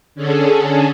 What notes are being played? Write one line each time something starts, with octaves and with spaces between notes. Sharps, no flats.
D3 C#4 G#4 A4